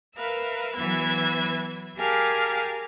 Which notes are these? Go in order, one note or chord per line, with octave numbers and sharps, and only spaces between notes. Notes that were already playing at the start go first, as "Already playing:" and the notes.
A#4 B4 E5 F5
E3 F#3 B3 B4 E6 G#6
G4 G#4 A#4 F5 G#5 A5